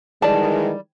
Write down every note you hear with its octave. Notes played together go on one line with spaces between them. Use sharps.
D#3 E3 G3 G#3 D5 A5